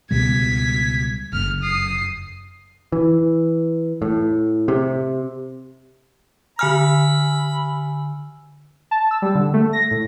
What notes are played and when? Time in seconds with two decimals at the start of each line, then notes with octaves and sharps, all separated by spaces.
0.11 C#2 B2 G3 G#6 B6
1.33 F#1 F6
1.63 D#6 C7
2.92 E3
4.02 A2
4.68 C3
6.59 D3 G#5 B5 E6 F6
8.91 A5
9.11 E6
9.22 G3
9.35 D3
9.54 A3
9.73 A#6
9.91 A2